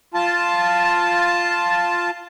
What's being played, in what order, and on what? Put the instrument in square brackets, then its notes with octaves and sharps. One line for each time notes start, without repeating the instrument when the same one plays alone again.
[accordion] F4 A5